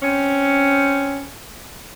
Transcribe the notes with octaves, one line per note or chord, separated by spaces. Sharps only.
C4 C#4